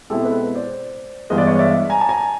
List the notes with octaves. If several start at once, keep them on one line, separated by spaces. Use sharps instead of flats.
B2 G#3 C4 E4 G4 A4
A4 B4
C5 D5
G2 E3 G#3 B3 D#5
D5
C#5 D#5
D5 E5
G#5 A#5
A5
G#5 A#5